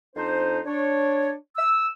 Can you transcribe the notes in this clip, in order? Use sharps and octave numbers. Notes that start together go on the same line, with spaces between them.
F2 D4 D#4 C5
D4 C#5
E6